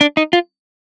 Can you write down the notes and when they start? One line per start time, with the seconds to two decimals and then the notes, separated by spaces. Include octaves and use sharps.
0.01 D4
0.17 D#4
0.33 F4